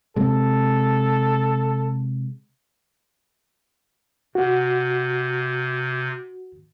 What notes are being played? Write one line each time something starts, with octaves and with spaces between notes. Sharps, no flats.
C3 G#3 A4
C3 F#4